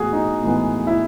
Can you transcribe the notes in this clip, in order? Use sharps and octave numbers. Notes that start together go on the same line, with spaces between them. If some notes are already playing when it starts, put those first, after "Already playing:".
Already playing: A2 E3 G#3 B3 F#4 G#4
D#4
A2 E3 G#3 B3
E4